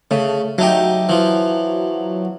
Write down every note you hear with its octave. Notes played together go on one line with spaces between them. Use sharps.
C#3 A3
F#3 A3 D#4 G4
E3 F3